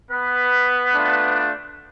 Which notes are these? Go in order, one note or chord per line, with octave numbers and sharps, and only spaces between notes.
B3 B4
A3 D4 F4